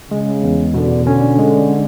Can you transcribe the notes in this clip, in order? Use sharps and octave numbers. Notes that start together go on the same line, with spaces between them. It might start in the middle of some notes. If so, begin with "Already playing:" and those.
C#3 G#3
E2
B2 D3
D3 C#4
G#3